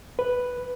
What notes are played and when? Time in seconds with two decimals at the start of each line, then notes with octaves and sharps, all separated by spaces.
0.19 B4